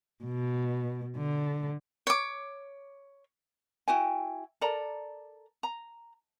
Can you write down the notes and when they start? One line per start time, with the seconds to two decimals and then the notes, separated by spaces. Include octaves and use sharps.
0.24 B2
1.17 D3
2.07 C#5 D6
3.88 E4 F#4 G5 G#5
4.61 A4 A#4 D5 A#5
5.63 A#5